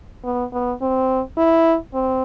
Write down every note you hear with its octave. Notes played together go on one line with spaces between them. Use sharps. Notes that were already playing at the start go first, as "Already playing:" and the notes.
B3
B3
C4
E4
C4